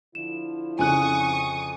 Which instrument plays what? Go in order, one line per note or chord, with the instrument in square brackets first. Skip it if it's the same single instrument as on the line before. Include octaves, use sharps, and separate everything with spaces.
[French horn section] D3 F3 E4 [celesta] E7
[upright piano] F2 C#3 F#6 [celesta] G#5 [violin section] C#6 D#6